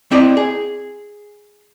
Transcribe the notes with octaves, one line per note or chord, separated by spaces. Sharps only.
C4 E4 D5 D#5
G#4